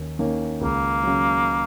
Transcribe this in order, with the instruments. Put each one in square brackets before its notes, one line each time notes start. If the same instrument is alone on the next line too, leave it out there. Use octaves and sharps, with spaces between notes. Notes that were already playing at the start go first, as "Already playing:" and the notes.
Already playing: [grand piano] D#2 D#3 C#4
D#3 A#3 C#4
[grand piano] C#2 [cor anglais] A#3
[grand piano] C#3 F#3